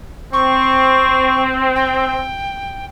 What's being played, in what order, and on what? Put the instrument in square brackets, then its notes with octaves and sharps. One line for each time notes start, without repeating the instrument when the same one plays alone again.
[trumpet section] C4 [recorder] C#6
[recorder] G5